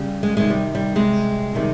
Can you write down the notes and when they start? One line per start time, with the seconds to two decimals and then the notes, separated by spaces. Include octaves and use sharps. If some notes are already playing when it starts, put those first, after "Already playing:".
Already playing: C#3 G3
0.23 G#3
0.37 C3 D#3 G3 G#3
0.50 G3
0.75 G3
0.95 C3 G3 G#3
1.55 C3 D#3 G3